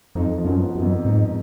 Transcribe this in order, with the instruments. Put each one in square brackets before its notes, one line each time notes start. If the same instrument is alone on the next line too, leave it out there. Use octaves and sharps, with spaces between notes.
[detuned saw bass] F2 [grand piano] D#4
[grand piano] F3
[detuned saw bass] F#2
[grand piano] B3
[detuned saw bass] F#2
[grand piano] F2
[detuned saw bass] G#2 [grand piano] D#4